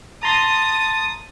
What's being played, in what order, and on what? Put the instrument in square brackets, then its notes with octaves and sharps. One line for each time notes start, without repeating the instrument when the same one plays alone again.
[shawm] A5 [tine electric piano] A#5 C6 A6 [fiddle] D#6